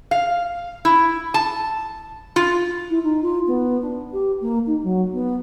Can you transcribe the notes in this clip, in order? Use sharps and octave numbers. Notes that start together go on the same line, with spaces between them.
F5
E4
A5
F4
E4
D#4
F4
B3
D4
G4
A#3
D#4
F#3
B3